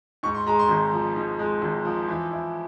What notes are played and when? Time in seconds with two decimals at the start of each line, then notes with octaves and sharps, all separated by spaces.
0.23 G#2 C#6
0.35 C6
0.47 G#3 A#5
0.59 C6
0.69 G#1
0.93 F3
1.16 G#2
1.39 G#3
1.62 G#1
1.85 F3
2.09 E3
2.31 E4